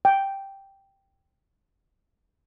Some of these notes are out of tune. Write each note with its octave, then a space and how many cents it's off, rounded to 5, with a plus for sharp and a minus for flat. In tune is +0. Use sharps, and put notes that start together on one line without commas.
G5 +0